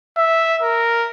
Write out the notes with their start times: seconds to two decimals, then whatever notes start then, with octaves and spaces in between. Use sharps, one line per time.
0.17 E5
0.62 A#4